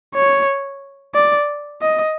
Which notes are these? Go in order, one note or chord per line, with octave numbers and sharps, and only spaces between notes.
C#5
D5
D#5